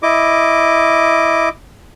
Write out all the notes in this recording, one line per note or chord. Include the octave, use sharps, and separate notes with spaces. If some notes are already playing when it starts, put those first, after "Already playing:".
E4 D#5 D6